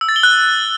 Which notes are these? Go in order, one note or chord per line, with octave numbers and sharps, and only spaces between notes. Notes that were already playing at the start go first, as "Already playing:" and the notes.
E6
A6
G7
F#6